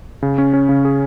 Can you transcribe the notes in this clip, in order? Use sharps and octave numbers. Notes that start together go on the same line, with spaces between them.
C#3
C#4
C#4
C#3
G#4